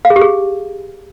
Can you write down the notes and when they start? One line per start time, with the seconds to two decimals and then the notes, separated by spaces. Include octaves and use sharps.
0.05 F5
0.10 G#4
0.16 G4
0.21 G#4